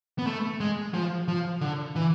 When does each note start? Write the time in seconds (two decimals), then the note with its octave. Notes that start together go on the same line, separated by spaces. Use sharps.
0.18 B3
0.27 A3
0.60 G#3
0.94 F3
1.28 F3
1.61 D3
1.96 E3